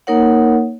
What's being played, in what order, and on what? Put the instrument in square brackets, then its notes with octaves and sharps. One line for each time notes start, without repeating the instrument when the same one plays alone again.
[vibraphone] A#3 D#4 A#4 C#5 F#5